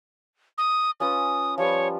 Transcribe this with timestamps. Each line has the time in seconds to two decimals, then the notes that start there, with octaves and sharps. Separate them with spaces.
0.58 D#6
1.00 C#4 F4 B4 D#6
1.58 F3 G3 B4 C#5